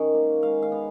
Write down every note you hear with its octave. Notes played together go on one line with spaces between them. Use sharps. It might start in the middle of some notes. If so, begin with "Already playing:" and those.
Already playing: D#3 C#4
A#3
G#3 F5
F5
B3